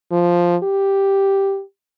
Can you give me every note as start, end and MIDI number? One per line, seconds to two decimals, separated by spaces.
0.12 0.56 53
0.63 1.62 67